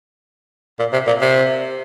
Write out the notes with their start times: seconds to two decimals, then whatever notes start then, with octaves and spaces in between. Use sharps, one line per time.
0.79 A#2
0.93 C3
1.07 A#2
1.21 C3